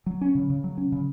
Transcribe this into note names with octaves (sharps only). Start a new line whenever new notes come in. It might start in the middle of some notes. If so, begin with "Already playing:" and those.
F#3
C#4
C#3
C#3
F#3
C#4
C#3